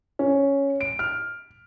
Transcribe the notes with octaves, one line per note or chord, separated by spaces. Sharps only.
C#4
D7
F6